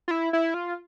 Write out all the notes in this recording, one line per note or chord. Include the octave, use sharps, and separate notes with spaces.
F4
E4
E4
F4